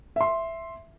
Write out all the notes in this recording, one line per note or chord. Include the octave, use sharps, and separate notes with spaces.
E5 C6